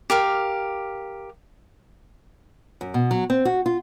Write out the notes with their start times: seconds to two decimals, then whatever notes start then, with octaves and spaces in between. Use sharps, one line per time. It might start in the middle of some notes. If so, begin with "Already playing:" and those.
0.10 G4 A#4 F5
2.81 F#2
2.94 B2
3.11 F#3
3.30 C4
3.45 F#4
3.66 F4